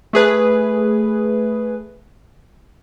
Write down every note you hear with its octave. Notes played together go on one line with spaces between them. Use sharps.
A3 G#4 B4